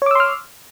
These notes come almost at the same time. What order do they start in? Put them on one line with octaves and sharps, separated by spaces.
C#5 D6 E6 C6 F6